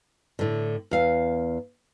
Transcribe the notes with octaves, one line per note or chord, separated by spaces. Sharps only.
A2 D3
E2 F5